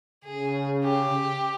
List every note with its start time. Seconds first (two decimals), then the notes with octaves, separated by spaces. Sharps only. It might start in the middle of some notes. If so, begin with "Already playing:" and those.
0.25 C#3 G#4
0.83 G4